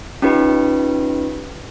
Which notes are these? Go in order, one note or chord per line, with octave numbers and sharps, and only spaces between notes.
C#4 D#4 F4 G4 B4